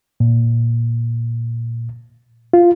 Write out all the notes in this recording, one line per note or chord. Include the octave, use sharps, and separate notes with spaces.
A#2
F4